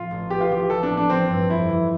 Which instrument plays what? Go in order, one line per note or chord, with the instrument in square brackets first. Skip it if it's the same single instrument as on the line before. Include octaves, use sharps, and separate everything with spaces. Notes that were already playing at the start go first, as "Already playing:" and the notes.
Already playing: [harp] A2 F3 C4 [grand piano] F4
[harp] A1
[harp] B3 [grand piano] G4
[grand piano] F4
[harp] E3 [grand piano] G4
[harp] F3 [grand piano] A4
[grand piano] D4
[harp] A2
[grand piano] D4
[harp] F3 [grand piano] C4
[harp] G2
[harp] F2 [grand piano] E4
[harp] E3